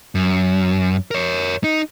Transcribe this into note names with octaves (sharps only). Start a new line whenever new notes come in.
F#2
A#4 C#5
D#4